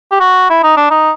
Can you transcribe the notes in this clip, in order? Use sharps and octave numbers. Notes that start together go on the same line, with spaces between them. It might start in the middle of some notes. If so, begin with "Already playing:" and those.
G4
F#4
E4
D#4
D4
D#4